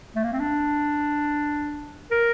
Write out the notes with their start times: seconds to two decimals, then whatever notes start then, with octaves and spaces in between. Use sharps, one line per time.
0.16 A3
0.24 A#3
0.33 C4
0.40 D4
2.11 A#4